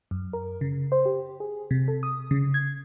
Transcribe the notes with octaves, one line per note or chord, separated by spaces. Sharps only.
F#2
A#4
C#3
C5
G4
G#4
C3
A4
D#6
C#3
G#6